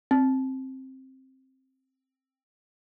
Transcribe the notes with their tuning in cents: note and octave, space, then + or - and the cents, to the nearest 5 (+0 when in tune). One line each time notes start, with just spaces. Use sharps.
C4 +10